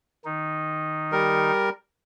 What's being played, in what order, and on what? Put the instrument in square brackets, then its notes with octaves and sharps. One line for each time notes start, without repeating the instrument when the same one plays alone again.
[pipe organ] D#3 D#4
[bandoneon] G3 A#4